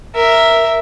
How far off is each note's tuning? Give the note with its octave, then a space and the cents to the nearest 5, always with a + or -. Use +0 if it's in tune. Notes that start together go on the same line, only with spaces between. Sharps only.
A#4 +0 E5 +0